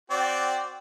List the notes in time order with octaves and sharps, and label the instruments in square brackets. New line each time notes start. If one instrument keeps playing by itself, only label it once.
[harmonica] C4 F#4 D5 [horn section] G5